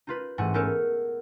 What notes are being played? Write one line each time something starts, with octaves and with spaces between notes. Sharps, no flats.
D#4 F4 B4
A1 G#2 A3 F#5 G#5 D#7
B3 D#4 A4 A#4 C#5